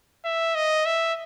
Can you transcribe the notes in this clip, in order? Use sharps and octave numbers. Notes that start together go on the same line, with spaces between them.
E5
D#5
E5